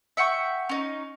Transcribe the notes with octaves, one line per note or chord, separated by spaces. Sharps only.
E5 F#5 G5 C#6
C#4 D#4